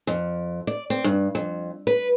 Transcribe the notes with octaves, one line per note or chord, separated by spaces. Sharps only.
F2
D5
C4
G2
F2
B4